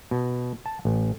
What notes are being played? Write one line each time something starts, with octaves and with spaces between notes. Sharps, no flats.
B2
A5
A1